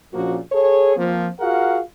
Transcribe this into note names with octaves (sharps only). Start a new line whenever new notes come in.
A#1 A#2 F3 A#3 C#4 F#4
G#4 A4 C#5
F3 A#3 C4
F4 F#4 G#4 A#4 F5 F#5